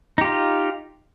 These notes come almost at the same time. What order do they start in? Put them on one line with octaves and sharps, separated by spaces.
D#4 G4 F4